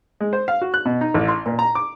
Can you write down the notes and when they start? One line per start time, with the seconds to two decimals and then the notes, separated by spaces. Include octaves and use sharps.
0.20 G#3
0.33 C5
0.48 F5
0.62 F#4
0.74 F#6
0.85 B2
1.01 D#4
1.14 A1
1.28 C6
1.46 A#2
1.59 A#5
1.75 D6